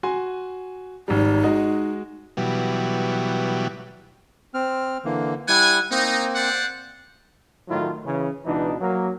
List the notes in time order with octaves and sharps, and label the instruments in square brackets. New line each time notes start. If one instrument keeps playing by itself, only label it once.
[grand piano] F#4 G#5 C6
[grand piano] G#1 G3 [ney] D#4
[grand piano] G#3 F#4 D#5
[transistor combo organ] B2 E3 F#3 G3
[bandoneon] C4 F6
D3 E3 A#3
[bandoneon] G3 E4 [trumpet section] F#5 G#5
[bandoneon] A#3 C4 [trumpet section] D#4
[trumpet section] C5 D5 F#5
[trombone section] A2 D#3 F#3 A3 E4 F4
C#3 E3 C#4
C#2 B2 E3 D4 D#4
F#3 A#3